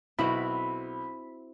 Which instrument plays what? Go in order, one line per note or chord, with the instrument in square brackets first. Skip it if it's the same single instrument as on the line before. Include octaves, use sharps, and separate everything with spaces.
[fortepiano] B1 [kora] C4 F#4 [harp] E4 [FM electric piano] B5